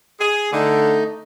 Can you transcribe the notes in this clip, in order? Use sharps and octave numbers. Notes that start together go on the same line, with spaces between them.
G#4
D3 A3 D#4